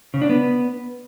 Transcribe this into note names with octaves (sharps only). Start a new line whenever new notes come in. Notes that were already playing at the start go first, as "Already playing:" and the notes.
C#3
D4
B3